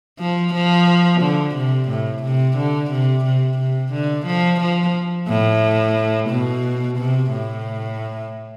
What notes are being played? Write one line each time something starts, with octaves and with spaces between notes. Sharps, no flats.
F3
F3
D3
C3
A2
C3
D3
C3
C3
C3
D3
F3
F3
A2
B2
C3
A2